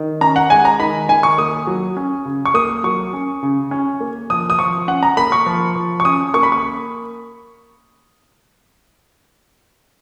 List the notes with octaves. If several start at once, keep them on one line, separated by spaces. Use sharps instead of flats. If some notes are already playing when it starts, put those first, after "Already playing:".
Already playing: D#3
C#4 A#5
F#5
G#3 G#5
A#5
D#3 B5
D#3 G#5
C#6
A#3 D#6
F#3
C#4
C#3
C#6
A#3 D#6
F#3 C#6
C#4
C#3
C#4
A#3
F3 D#6
D#6
F3 C#6
C#4 F#5
A#5
A#3 B5
C#6
F3
F3
C#6
C#4 D#6
A#3 C#6
B5
C#6